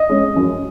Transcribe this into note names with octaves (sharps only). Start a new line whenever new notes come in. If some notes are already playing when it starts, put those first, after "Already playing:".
Already playing: D#5
G#3 C#4
F#2